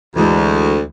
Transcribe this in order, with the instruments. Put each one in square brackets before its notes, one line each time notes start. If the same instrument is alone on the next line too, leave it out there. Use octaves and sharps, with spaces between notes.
[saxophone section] D2 [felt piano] E3 G#3